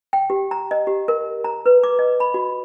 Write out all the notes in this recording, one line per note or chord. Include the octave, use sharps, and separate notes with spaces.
G5
G4
A#5
D#5
G4
A#4
A#5
B4
D6
D#5
B5
F#4